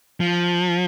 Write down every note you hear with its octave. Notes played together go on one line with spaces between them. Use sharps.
F3